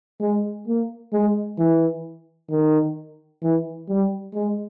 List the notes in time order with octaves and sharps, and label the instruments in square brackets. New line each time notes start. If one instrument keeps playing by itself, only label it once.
[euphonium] G#3
A#3
G#3
E3
D#3
E3
G3
G#3